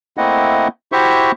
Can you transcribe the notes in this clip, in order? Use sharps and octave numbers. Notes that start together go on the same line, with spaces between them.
A3 A#3 C4 E4 D#5 F#5
E4 F#4 G4 C5 E5 C#6